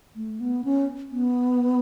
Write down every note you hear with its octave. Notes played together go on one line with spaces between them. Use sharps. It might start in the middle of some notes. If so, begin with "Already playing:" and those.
A3
B3
C#4
B3